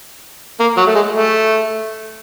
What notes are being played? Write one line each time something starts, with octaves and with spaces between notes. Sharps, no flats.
A#3
F#3
A3
G#3
A3